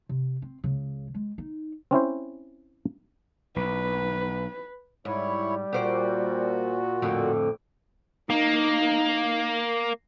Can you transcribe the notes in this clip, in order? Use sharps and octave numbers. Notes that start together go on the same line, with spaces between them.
C3
C4
C#2 C#3
G#3
D#4
C4 C#4 E4 C5
B1 B4
G#2 G3 E4 C#5
A#2 F#4 G4 C5 D5
F2 A2 D3
A#3 D#4